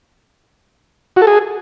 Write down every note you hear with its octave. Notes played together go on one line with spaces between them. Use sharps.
F#4
A4
G#4